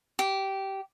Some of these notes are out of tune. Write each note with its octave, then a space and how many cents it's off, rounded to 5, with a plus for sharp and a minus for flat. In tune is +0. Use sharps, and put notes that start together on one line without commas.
G4 -15